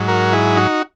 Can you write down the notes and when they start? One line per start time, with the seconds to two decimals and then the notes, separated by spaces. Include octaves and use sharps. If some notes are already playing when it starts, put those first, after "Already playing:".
Already playing: G#2 F#3
0.08 F#4 A#4
0.32 E4 G#4
0.56 D#4 F#4